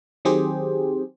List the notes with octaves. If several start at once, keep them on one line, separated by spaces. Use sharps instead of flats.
D#3 F#3 C4 G4 G#4 C5